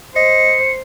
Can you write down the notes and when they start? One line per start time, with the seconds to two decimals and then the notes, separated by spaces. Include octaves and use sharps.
0.16 C5 D#5 C#7